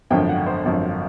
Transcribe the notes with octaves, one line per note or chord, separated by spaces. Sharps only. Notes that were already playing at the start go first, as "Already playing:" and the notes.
G#1 F#2 D3 F3 G5
F#5
C5
G#1 F#2 D3 F3